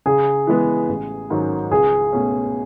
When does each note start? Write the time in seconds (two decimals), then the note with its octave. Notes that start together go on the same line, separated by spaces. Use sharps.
0.06 C#3 G#4
0.47 E3 G#3 B3
0.89 A1
1.30 G#2 D#3 F#3 C#4
1.71 C#2 G#4
2.13 B2 A3 C#4